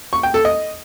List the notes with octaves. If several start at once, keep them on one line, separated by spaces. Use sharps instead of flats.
C#6
G5
A4
D#5